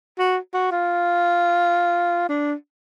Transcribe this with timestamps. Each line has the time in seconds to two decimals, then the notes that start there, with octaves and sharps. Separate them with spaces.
0.19 F#4
0.54 F#4
0.71 F4
2.29 D4